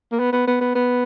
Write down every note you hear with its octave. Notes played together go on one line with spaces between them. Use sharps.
A#3
B3
B3
B3
B3
B3